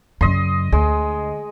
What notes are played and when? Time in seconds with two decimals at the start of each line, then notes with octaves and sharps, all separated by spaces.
0.21 F#2 C#3 D#5 C6
0.72 D2 G#3